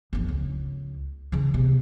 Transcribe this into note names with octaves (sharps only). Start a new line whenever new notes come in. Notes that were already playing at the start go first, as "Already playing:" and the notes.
G1 F2
C#2
C#3 E3
C3 B3